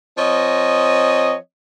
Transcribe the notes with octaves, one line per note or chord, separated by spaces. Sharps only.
F3 C4 C#5 D#5